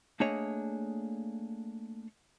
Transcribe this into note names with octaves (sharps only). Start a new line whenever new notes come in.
A3 A#3 D4 G#4 C#5 D#5